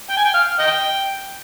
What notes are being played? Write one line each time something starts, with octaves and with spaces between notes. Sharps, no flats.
G5
G#5
G5
F5
D#5 G5